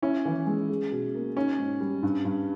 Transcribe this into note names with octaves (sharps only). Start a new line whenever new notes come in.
C#4 E4
E3
G#3
G#4
B2
A#3
C#4 D#4
G#2
G3
G2
G2